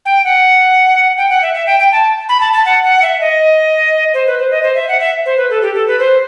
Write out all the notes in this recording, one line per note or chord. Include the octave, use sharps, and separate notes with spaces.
G5
F#5
G5
F#5
E5
E5
G5
G5
A5
B5
A5
A5
F#5
F#5
E5
D#5
C5
B4
C5
D#5
C5
E5
F#5
E5
C5
B4
A4
G4
A4
B4
C5